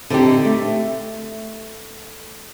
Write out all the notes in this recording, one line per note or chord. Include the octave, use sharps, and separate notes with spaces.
D3 C4 D#4 G4
A3